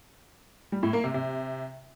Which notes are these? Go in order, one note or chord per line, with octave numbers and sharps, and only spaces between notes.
G3
A2
A#3
C3
C3